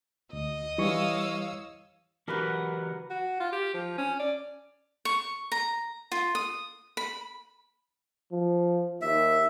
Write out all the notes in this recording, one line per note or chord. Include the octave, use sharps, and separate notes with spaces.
D2 D#5
E3 G3 C#5 F5 C#6 E6
E3 F#4 G4 A#4 B4 F#5
F#4
F4
G4
F3
C#4
D5
C#6
A#5
F4
D#6
B5
F3
D#2 E5